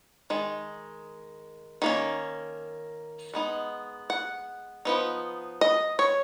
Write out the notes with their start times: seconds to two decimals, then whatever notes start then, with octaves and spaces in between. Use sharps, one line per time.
0.30 D#3 G#3
1.82 D#3 A#3 C#4
3.34 G#3 B3 D#4
4.10 F#5
4.85 F3 B3 D#4
5.61 D#5
5.99 C#5